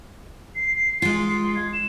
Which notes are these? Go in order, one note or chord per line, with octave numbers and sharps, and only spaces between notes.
C7
G#3 F4 C7
G#6
E7